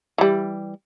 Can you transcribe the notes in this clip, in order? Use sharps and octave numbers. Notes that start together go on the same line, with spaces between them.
E3 G3